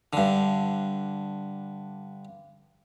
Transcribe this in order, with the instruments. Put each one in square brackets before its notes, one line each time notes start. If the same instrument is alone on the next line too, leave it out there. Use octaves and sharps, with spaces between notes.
[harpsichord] G2 D3